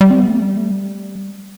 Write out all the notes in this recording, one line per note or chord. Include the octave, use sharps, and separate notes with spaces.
G3
C4
B3
A3
G3
A3
G3